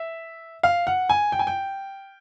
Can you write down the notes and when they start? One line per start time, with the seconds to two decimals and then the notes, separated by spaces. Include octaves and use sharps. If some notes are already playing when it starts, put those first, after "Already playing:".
Already playing: E5
0.63 F5
0.87 F#5
1.09 G#5
1.32 G5
1.39 G#5
1.47 G5